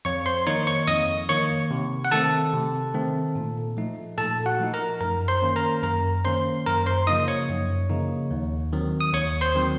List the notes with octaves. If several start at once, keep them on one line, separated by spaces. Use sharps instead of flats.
F2 C#5 C#6
C5 C6
D#3 A#3 D#4 C#5 C#6
C#5 C#6
F2 D#5 D#6
D#3 A#3 D#4 C#5 C#6
C3
F#5
D#3 A3 C4 A4 A5
C3
D#3 A3 C4
A#2
F3 A3 D#4
A#2 A4 A5
F#4 F#5
F3 A3 D#4
A#4 A#5
F#2 A#4 A#5
C5 C6
D#3 A#3 C#4
A#4 A#5
F#2 A#4 A#5
D#3 A#3 C#4 C5 C6
F#2 A#4 A#5
C5 C6
C#3 F3 A#3 D#4 D#5 D#6
C#5 C#6
F#2
C#3 F3 A#3 D#4
D#2
D#3 F#3 C4
D#6
D#2 C#5 C#6
C5 C6
D#3 F#3 C4